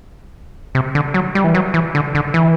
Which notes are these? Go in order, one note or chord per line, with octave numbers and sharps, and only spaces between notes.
C3
D3
F#3
G3
E3
F#3
E3
D3
D3
E3